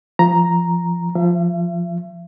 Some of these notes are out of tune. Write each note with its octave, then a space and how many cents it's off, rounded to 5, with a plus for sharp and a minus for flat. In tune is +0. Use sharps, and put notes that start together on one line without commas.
F3 -10 A#5 +5
F3 +0 E5 +45